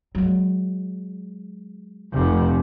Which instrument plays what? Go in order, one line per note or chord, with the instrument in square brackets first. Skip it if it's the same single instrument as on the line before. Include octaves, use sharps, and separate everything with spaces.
[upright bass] F#3 G#3
[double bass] F1 C3